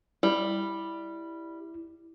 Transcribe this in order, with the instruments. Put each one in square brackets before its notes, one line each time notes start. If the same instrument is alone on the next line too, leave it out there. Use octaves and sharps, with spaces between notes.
[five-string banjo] G3 [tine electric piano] E4